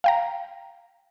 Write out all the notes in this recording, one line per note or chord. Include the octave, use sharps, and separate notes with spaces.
F5 G5 A#5